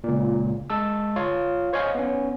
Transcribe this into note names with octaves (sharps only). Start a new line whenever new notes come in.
C#2 A#2
G#3 A5 E6
F4 C#5 F5
C5 C#5 D#5 F5 G#5
B3 C#4